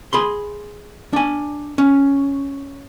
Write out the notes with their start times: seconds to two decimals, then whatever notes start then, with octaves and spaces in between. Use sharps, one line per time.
0.13 G#4 B5 C6
1.13 D4 G#5
1.78 C#4